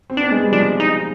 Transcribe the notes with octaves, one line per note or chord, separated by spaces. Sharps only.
C4
B3 D4
G#3
G3
F3 D4
D#4